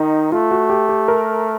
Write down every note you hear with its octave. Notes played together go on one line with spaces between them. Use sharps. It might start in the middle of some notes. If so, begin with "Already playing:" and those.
Already playing: D#3 D#4
A3 F4
F#4
G4
G4
A#4